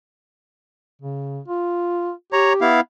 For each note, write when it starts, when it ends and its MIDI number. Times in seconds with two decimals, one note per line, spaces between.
1.02 1.40 49
1.48 2.12 65
2.33 2.68 67
2.33 2.53 73
2.33 2.53 82
2.61 2.80 59
2.61 2.80 64
2.61 2.80 77